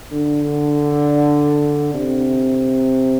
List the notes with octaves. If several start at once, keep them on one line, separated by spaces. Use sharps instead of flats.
D3
C3